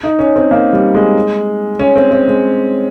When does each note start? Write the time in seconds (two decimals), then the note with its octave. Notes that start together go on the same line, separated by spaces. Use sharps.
0.03 D#4
0.19 C#4
0.36 C4
0.51 A#3
0.73 G3
0.95 G#3
1.79 C#4
1.96 C4
2.11 C4
2.28 G#3